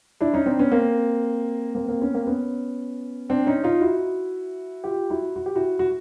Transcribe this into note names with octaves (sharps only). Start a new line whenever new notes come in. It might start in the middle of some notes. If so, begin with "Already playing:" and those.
D4 E4
C#4 D#4
C4 D4
B3 C#4
A#3 C4
A#3 C4
A#3 C4
B3 C#4
A#3 C4
B3 C#4
C4 D4
C#4 D#4
D#4 F4
E4 F#4
F4 G4
E4 F#4
F#4
G4
E4 F#4
F#4